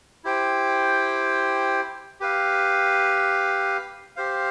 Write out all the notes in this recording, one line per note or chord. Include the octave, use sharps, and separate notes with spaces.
E4 G4 C5 G5
G4 B4 F5
G4 C5 F5